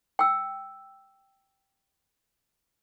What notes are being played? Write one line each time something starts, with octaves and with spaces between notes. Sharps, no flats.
G5 E6